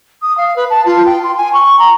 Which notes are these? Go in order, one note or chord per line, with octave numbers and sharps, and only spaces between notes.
D#6
F5
B4
A5
F4
G5
C6
G#5
C#6
A#5